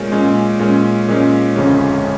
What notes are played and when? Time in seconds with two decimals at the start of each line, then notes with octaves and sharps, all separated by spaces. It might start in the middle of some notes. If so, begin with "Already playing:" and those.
Already playing: A#2 G#3 C#4
0.12 A#2 G#3 C#4
0.60 A#2 G#3 C#4
1.08 A#2 G#3 C#4
1.56 G1 F2 C#3 G#3 C#4